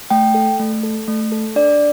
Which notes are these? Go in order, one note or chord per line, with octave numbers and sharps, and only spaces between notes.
A3 G5
A4
A3
A4
A3
A4
D4 D5